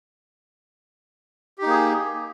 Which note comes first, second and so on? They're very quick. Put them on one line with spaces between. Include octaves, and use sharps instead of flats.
G4 D#4 A#3 G#4